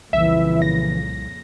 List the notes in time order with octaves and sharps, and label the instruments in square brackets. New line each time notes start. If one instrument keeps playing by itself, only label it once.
[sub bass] C2 [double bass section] F2 A#2 C#3 [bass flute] E3 [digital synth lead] E5
[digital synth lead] A#6